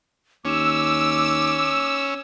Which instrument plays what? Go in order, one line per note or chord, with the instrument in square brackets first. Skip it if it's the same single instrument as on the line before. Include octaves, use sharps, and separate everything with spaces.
[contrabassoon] D#2 [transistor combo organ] C#4 [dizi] D6 [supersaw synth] E6